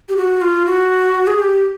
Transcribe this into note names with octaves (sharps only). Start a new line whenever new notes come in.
G4
F#4
F4
F#4
G#4
G4